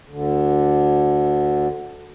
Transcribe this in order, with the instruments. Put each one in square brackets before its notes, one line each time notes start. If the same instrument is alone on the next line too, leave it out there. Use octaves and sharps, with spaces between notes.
[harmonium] D2 D3